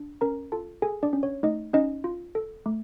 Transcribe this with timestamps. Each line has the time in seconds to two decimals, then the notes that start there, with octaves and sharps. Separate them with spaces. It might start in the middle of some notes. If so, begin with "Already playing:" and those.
Already playing: D4
0.21 C#4 A#4 A#5
0.52 F4 A4 A5
0.82 G#4 A4 G#5
1.03 D4 D5
1.13 C#4
1.23 C#5
1.43 A3 D#4 D#5
1.73 C#4 D#4 D#5
2.04 F4
2.35 A4
2.66 A3